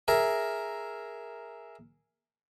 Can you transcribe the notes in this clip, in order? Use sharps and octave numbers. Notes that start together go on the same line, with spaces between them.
G#4 A#4 E5